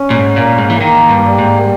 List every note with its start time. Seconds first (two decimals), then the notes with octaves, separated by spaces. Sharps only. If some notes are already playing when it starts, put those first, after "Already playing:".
Already playing: C#4
0.10 A#2
0.15 G#2
0.36 A#2 A#3
0.58 G#2
0.70 E3
0.81 D#3 A#3
1.09 G2
1.24 G3
1.38 G#2